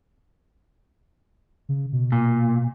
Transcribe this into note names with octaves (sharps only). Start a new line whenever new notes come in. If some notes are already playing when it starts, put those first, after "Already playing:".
C#3
B2
A#2